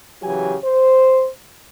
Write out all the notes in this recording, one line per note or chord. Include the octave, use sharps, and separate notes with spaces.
C#3 E3 F#3 G4 C#5 G#5
C5